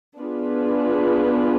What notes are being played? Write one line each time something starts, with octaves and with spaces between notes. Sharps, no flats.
B3 D4 F4 G#4 B4